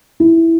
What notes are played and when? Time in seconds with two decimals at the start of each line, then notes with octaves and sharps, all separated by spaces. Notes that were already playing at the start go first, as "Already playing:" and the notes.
0.20 E4